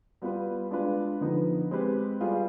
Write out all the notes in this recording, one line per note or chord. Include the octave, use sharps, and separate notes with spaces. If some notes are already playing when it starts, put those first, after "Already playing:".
G3 B3 F4 B4
G#3 D4 F4 B4
D3 F3 B3 D#4 B4
G#3 C4 G4 B4
G3 B3 F4 G#4